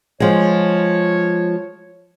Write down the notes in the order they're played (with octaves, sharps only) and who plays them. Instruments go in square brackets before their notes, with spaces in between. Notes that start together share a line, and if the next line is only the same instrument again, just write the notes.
[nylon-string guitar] F3 G#3 [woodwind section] C#5